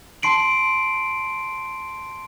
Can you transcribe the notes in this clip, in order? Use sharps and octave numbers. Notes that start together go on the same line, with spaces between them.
A5 C6 C7 D7 F#7